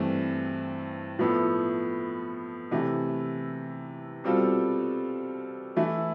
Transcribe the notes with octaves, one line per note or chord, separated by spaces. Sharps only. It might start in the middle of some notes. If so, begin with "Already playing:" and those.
Already playing: G2 E3 A3 C4
A2 F3 B3 E4 A4
C3 E3 A3 E4
B2 G3 C4 F4 A4
E3 A3 E4